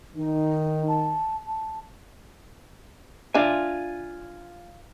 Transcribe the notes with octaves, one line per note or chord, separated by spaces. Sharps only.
D#3 D#4
A5
A5
D4 F4 E5 G#5